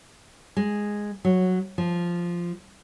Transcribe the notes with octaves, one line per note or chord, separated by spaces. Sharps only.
G#3
F#3
F3